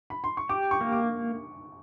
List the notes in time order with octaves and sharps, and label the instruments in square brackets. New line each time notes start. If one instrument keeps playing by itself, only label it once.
[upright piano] B5
C6
C#6
[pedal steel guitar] G4 [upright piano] D6
[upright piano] C#6
[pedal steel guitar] A#3
[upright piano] D6